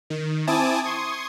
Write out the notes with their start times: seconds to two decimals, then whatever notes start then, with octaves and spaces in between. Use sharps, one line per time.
0.10 D#3
0.47 C4 E4 G#5 A5 D6 D#6
0.83 C6 C#6 D#6 G#6